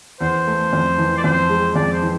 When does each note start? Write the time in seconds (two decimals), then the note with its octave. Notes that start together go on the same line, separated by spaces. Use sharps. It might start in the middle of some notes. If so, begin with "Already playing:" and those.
0.21 E2 C5
0.47 A3
0.73 F2
0.98 E3
1.18 D5
1.24 F2 C5
1.50 G#3
1.76 F2 D5
1.93 C5
2.02 E3